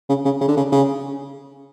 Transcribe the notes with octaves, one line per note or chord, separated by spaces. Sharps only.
C#3
C#3
C#3
D3
C#3
C#3